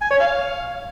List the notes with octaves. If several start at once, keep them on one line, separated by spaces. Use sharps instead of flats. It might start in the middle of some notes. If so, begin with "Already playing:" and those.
G#5
C#5
F5